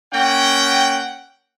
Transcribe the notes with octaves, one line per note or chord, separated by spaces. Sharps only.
A#3 C#4 F#5 G5